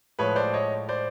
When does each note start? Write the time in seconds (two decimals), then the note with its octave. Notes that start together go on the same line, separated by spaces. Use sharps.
0.19 A2 F3 G#3 B4 C#5
0.36 C5 D5
0.54 C#5 D#5
0.89 C5 D5